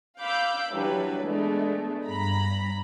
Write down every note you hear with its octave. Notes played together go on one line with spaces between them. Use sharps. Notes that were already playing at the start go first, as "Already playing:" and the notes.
F5 B5 D6 E6 G6
E3 F#3 G3 D4 E4 B4
G#3 A3 B3 D4
G2 A#5 B5